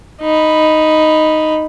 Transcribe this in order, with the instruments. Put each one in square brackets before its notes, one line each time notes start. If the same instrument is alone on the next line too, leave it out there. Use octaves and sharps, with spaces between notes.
[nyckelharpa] D#4 B5